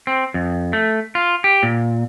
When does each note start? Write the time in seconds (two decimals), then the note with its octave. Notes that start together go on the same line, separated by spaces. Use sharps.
0.07 C4
0.34 F2
0.73 A3
1.15 F4
1.44 G4
1.63 A#2